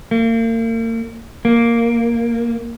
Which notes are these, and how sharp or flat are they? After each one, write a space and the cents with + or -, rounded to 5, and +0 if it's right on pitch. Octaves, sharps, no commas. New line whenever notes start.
A#3 -40
A#3 +0